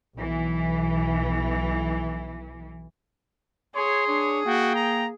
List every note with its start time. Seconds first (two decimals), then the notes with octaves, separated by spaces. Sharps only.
0.16 B1 E3
3.75 G#4 C#5 C6
4.08 D4 C#5
4.46 A#3 F#4 G5
4.75 A#5